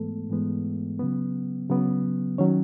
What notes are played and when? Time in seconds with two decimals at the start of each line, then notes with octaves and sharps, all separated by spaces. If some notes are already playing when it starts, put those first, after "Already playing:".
Already playing: G#2 E3 G#3 A3 B3 A4
0.30 G#2 E3 G#3 B3
1.00 C#3 F#3 B3
1.69 C#3 F#3 B3
2.38 D#3 F#3 C#4 C#5